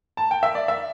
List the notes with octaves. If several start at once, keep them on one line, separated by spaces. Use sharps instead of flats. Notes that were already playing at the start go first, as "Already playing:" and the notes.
A5
G5
E5
D5
E5